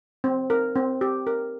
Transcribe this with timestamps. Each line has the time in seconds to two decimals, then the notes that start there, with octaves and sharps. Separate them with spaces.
0.24 C4
0.50 A#4
0.76 C4
1.01 G4
1.27 A#4